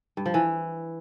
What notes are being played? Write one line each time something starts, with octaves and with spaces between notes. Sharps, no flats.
G2
F3
E3